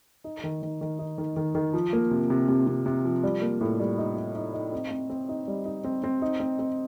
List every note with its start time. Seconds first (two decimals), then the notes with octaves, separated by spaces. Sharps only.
0.24 D#4
0.44 D#3
0.62 D#3
0.81 D#3
0.99 D#4
1.18 D#3
1.36 D#3
1.55 D#3
1.74 F3
1.93 A#3
2.11 C3
2.30 C3
2.48 C3
2.67 C3
2.86 C3
3.05 F3
3.23 G3
3.42 A#3
3.61 A2
3.79 G3
3.98 D#4
4.17 D#4
4.35 D#4
4.54 D#4
4.73 C4
4.91 C4
5.10 C4
5.29 D#4
5.48 G3
5.65 D#4
5.84 C4
6.04 C4
6.22 D#4
6.40 C4
6.59 C4